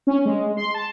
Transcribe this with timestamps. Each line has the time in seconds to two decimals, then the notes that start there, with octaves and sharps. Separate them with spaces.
0.07 C#4
0.25 G#3
0.57 C6
0.74 A5